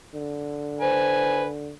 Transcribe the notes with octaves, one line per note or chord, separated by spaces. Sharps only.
D3
B4 C5 G#5